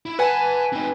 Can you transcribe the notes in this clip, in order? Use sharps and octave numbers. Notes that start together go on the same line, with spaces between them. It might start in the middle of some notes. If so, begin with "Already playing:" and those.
E4
B4 F#5 G#5 A5
C4 D#4